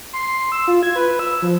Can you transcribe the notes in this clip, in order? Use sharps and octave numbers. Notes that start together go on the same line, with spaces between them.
C6
E6
F4
G#6
B4
E6
F3